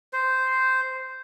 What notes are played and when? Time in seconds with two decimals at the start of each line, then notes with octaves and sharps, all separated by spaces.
0.13 C5